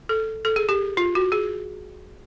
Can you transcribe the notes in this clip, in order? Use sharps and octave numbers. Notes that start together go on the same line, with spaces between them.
A4
A4
G#4
G4
F4
F#4
G#4